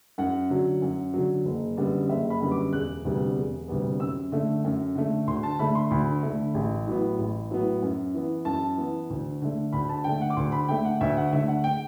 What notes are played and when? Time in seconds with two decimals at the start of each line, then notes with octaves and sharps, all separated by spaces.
0.18 F#2 F#5
0.50 D3 F#3
0.82 F#2
1.14 D3 F#3
1.45 F#1
1.77 F#2 D3 G3 B3
2.09 F#1 E5
2.30 B5
2.41 F#2 D3 G3 B3
2.52 D6
2.73 E1 F#6
3.05 D2 C3 G3 B3
3.37 E1
3.68 D2 C3 G3 B3
4.00 F#2 E6
4.32 D3 A3
4.64 F#2
4.95 D3 A3
5.27 D2 C6
5.43 A5
5.59 D3 A3 B5
5.75 C6
5.91 D2 B5
6.23 D3 A3
6.54 A1
6.87 A2 F#3 B3
7.18 A1
7.50 A2 F#3 B3
7.82 F#2
8.14 E3 B3
8.45 F#2 A5
8.78 E3 B3
9.10 D2
9.42 D3 A3
9.73 D2 B5
9.89 A5
10.04 D3 A3 G5
10.21 F#5
10.30 D6
10.37 D2 C6
10.52 B5
10.69 D3 A3 G5
10.85 F#5
11.01 D2 E5
11.17 F#5
11.33 D3 A3 E5
11.48 F#5
11.64 G5